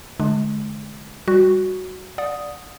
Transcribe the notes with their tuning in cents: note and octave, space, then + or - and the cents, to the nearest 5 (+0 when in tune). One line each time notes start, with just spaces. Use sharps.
D3 +0 G#3 +30 D4 +20
G3 +0 F#4 +0
D5 +0 F#5 -35 D#6 +0